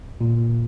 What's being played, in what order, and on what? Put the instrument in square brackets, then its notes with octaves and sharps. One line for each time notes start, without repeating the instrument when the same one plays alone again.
[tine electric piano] A#2